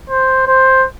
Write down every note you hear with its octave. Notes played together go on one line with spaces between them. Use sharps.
C5
C5